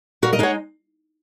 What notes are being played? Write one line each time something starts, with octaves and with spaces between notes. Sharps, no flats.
A#2 F#4 A#4
A#4 D#5
G#3 D#4 C#5 F#5